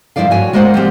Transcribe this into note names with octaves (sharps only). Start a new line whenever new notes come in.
G2 C#3 F3 E4 D5 F5
F#4 C#5 G#5
G#3 A#3 C5 D5 F#5
F3 C4 G4